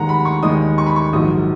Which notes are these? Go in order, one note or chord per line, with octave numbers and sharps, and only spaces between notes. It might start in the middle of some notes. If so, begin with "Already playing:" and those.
Already playing: D#2 D#3 G#3 F#5 A#5
B5
C#6
D#2 D#3 G#3 D#6
C#6
B5
C#6
A#1 G#2 D#3 F#3 D#6